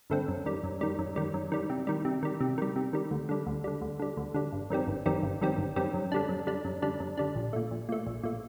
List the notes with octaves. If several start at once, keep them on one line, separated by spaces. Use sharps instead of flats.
G2 D3 A3 C4
F#2
D#3 G3
F#2
D#3 G3
F#2
D#3 G3
F#2
D#3 G3
C3
D#3 G3
C3
D#3 G3
C3
D#3 G3
C3
D#3 G3
D2
D3 G3
D2
D3 G3
D2
D3 G3
D2
D3 G3
G1
F#2 D#3 G3 C4
G1
F#2 D#3 G3 C4
G1
F#2 D#3 G3 C4
G1
F#2 D#3 G3 C4
F#2
D3 G3 D4
F#2
D3 G3 D4
F#2
D3 G3 D4
F#2
D3 G3 D4
A#1
A#2 A3
A#1
A#2 A3
A#1
A#2 A3